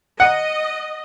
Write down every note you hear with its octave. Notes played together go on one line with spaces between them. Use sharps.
D#5 F#5